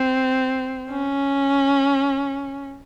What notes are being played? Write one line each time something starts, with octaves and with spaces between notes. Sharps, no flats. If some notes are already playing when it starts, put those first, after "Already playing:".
Already playing: C4
C#4